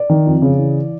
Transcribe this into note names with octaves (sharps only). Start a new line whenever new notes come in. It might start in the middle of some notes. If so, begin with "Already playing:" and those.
Already playing: D5
D#3
F2
C#3
E3